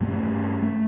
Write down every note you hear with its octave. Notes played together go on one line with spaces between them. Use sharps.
G2 A3 C#4
A3